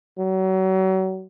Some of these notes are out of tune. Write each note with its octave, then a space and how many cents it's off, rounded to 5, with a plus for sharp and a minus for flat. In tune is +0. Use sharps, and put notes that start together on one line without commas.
F#3 +35